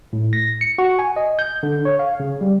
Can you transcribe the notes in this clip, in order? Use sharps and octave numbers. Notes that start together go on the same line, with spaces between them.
A2
A#6
C#7
F#4
G#5
D#5
G6
D3
C#5
F5
C#3
G3